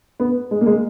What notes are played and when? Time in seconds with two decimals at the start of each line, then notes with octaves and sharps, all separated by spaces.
0.20 B3
0.51 G#3
0.61 A#3
0.66 G#3